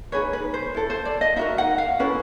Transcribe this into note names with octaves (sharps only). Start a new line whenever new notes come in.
D#4 G#4 B4 C#5
B4
C5
E4 A4
C5
D5
D#5
D#4 F#4 A#4 E5
F#5
F5
C#4 E4 A4 B4